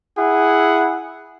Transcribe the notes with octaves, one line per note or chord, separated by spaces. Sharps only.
E4 G#4 F#5